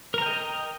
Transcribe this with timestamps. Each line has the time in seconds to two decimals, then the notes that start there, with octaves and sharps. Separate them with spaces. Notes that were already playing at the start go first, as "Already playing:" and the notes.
0.14 A#4
0.18 A#5
0.22 G5
0.26 D#5